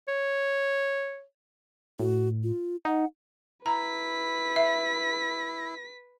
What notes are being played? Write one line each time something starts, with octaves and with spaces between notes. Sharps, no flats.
C#5
A2 F#4
F4
D#4 F#5
E4 B4 A#5 B6
E5